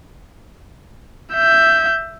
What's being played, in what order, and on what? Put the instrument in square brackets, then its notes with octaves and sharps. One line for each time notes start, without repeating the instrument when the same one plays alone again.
[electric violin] E5 G6